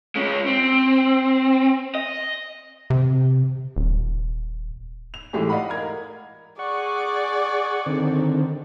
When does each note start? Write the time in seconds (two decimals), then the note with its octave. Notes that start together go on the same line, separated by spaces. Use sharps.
0.16 G#3 C#4
0.47 C4
1.95 D#5
2.90 C3
3.76 D#1
5.14 F7
5.33 A2 E3 G#3 A3 G4
5.50 D5 D#5 F5 F#5 B5
5.70 A#4 G#6
6.59 G#4 D5 F#5 C#6
7.86 D3 D#3 C4